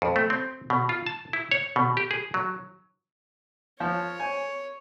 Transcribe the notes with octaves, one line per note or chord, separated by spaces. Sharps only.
F2
A3
C4
B2
F4
A5
E4
C#5
B2
G4
G#4
F#3
F3 C#5
G#5